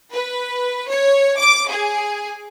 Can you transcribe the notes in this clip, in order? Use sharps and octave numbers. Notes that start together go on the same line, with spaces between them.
B4
C#5
D6
G#4